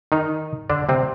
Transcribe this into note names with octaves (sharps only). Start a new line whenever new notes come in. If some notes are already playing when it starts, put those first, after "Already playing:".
D#3 D#4
D3 D4
C3 C4